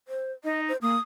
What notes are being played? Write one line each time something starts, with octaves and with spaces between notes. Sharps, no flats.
C5
D#4 D#5
C5
A#3 D#6